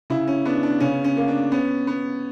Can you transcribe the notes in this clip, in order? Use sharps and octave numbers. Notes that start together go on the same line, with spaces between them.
C#3 E4
C#4
B3 D4
D4
C#3 C#4
C#4
A#3
D4
B3 C#4
B3